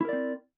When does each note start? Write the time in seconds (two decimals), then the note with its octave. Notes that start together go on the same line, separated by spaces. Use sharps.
0.01 E4
0.05 A#4
0.09 D5
0.13 C4